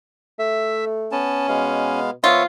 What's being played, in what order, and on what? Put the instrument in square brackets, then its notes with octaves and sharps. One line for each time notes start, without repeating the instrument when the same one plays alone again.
[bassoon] A3 [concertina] E5
[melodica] B3 A5 [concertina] C#4
[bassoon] B2 [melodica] G#3 B3 F5
[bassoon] F3 [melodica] B3 D#6 [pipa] F4 [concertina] C#5 E5